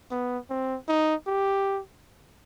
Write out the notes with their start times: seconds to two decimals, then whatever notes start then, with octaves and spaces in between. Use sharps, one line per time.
0.11 B3
0.50 C4
0.88 D#4
1.27 G4